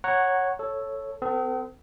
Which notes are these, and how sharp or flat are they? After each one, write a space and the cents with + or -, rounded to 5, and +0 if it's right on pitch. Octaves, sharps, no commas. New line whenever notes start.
C#5 -10 F#5 +0 A#5 +0
A4 +0 C#5 -5
C4 -45 A4 +25